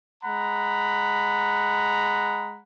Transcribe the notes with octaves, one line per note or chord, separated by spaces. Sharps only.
G#3 F#5 A#5 B5